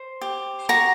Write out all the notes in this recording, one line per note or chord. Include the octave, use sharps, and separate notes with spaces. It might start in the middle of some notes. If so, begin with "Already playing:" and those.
Already playing: C5
G4
F#4 A#5